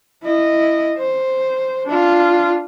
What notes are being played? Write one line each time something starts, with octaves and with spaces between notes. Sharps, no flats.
E4 D#5
C5
D4 F4